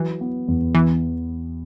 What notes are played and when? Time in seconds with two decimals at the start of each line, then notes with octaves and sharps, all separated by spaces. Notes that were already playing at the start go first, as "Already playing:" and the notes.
Already playing: E3 F#3
0.21 B3
0.48 E2
0.75 E3 B3